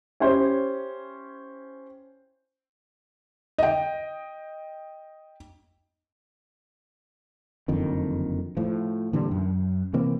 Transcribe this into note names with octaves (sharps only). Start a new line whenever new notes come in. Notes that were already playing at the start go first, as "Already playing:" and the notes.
C#4 E4 G4 C5 C#5
D#5 G5
F#1 F2 D3 D#3
A2 F3
A#2 D3 E3 G3
F#2
C3 E3 A#3 C4